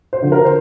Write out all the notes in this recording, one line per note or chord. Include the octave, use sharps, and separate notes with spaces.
C5
D3 F3
A#4
C5